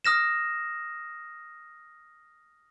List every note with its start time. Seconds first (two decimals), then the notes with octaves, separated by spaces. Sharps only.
0.05 D#6 F6 A#6 E7